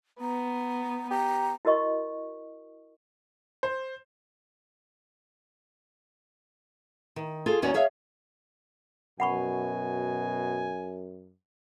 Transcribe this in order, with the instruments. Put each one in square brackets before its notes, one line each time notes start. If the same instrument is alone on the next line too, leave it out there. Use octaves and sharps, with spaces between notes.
[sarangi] B3 [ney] A#5
[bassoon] G4 [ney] A#5
[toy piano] E4 F#4 A#4 D#5 C#6
[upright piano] C5
[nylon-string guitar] D#3
F4 G#4 A4
D#2 C#4 D#4 F#4 C#5 D5
G#4 C#5 E5 F5
[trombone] F#2 [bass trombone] B2 [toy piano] F#5 B5 C#6 [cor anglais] G#5